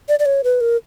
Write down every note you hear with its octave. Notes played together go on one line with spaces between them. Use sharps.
D5
D5
C#5
B4
A#4